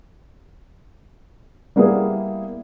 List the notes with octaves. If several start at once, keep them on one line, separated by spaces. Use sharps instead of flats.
G3 A#3 B3 E4 G#4